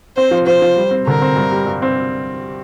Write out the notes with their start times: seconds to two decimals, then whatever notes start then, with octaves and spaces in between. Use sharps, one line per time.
0.17 C4 C5
0.31 F3
0.46 F3 C5
0.62 F3
0.76 G3
0.91 C4
1.06 D3 A#4
1.22 C4
1.36 G2
1.51 G3
1.66 G2
1.82 C4